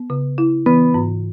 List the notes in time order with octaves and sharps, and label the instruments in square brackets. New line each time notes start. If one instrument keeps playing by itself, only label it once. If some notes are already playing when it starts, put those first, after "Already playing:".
Already playing: [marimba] B3
C#3
E4
[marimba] E3 [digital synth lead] B3
[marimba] G#2